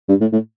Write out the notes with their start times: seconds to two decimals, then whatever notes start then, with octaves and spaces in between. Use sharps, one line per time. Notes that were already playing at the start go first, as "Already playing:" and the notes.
0.09 G2
0.21 A2
0.32 A2